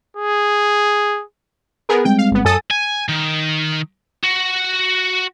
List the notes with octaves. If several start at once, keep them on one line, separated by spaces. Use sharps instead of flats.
G#4
B3 G#4 A#4
G3 G#3 C4 G5
F5
G1 B3
F#2 A4 G#5 D#6 A6
G#5
D#3
F#4